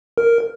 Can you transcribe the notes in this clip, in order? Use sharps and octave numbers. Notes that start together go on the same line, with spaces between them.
A#4